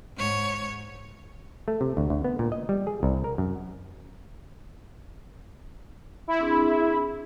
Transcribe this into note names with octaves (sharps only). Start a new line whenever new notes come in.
G#2 C#5
A3
C3
D2
D2
B3
A#2
D#5
G3
G#4
C2
A#4
F#2
E4
C4 D4 G#4